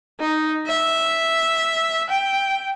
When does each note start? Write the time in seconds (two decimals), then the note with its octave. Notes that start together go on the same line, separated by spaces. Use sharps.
0.20 D#4
0.67 E5
2.10 G5